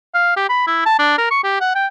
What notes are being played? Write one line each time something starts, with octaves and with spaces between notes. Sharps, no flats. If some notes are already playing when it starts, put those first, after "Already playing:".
F5
G4
B5
E4
A5
D4
A#4
C#6
G4
F#5
G5